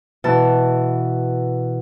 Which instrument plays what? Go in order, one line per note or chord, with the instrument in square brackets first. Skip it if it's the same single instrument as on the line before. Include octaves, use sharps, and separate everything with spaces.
[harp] B2 E3 A5